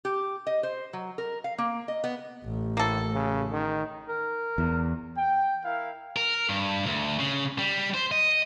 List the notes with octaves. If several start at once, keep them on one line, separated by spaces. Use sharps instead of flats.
G4
D#5
C5
F#3
A#4
F5
A#3
D#5
B3
A1
A2 A#3 A4
C#3
D#3
A#4
E2
G5
E4 A#4 F5
A#4
G2
D2
C#3
G3
C5
D#5